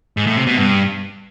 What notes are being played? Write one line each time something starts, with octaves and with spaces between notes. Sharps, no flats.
G#2
A2
C3
B2
G2